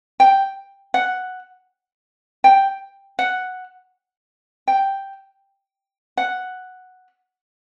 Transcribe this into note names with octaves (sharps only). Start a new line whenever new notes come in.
G5
F#5
G5
F#5
G5
F#5